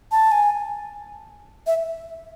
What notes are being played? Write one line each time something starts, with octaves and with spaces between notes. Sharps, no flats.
A5
G#5
E5